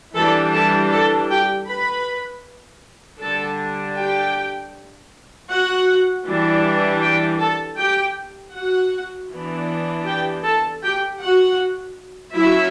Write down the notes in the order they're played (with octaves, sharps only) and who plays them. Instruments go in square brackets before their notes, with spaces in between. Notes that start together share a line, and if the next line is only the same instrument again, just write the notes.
[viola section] E3 G3 D4 A4 A5
A4 A5
A4 A5
G4 G5
B4 B5
D3 G3 D4 A4 A5
G4 G5
F#4 F#5
E3 G3 D4
G4 G5
A4 A5
G4 G5
F#4 F#5
E3 B3 D4
G4 G5
A4 A5
G4 G5
F#4 F#5
F#3 C#4 E4 E5